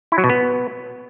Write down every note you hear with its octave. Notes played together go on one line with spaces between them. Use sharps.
E4
F#3
B2
B3